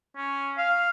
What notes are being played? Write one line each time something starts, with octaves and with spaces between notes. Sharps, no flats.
C#4
F5